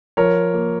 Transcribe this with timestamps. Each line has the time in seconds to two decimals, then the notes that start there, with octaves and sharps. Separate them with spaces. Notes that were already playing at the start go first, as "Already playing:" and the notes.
0.17 F3 A#4 C#5
0.54 A#3